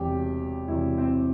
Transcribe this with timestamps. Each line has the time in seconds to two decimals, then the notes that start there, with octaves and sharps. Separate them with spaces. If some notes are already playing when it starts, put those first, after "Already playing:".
Already playing: E1 E2 C3 G4
0.68 E1 E2 C3 E4
0.98 C4